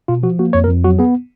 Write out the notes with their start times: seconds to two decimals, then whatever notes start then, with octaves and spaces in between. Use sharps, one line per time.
0.08 B2 F4
0.23 F3 F#4
0.39 A#3 F#4
0.53 F2 C#5
0.64 A#4
0.68 F2
0.84 F#3 F#4
0.99 B3 G#4